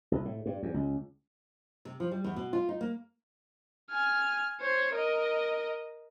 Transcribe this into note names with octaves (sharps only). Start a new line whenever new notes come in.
C2
A2
G2
E2
C#2
C3
F3
G3
E2
B2
F4
D#4
A#3
G#5 F6
C5 C#5
A#4 D#5